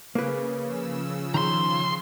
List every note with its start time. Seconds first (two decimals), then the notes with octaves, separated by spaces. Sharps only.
0.15 C#3 A#3 B4
0.62 F3 E6
1.34 D#3 A#5 C6